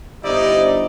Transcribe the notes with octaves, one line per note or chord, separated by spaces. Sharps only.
G1 D#4 E4 G4 C5 D5 D#5